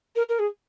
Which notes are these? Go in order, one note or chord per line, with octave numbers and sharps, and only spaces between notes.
A#4
A#4
G#4